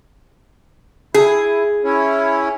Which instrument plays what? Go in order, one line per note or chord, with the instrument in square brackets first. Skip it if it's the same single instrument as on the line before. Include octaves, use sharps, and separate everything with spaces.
[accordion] E4 [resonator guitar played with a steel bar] G#4
[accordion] C#4 E4 C#5